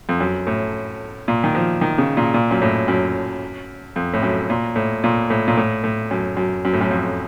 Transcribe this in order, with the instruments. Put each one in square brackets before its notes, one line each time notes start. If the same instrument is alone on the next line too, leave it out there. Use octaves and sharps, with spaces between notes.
[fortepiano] F2
F#2
A2
A#2
D#3
F3
D#3
C#3
A#2
A#2
F#2
A2
F#2
F2
A2
F#2
A#2
A2
A#2
A2
A#2
A2
A2
F#2
F#2
F#2
A2
F#2
F2